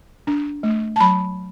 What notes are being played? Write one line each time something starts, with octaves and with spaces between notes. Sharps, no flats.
D4
A3
A5
F#3 B5